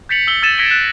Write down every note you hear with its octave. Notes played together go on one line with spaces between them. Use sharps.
G6 A6 B6 C#7 F7 F#7
E6 F#7 G7
E6 G#6 A6 D#7 E7
G#6 A#6 B6 C#7 D7 G7
F#6 E7